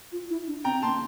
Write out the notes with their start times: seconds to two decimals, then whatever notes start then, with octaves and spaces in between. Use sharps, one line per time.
0.12 F4
0.30 E4
0.47 D4
0.64 C4 G5 A#5
0.82 A#3 A5 C6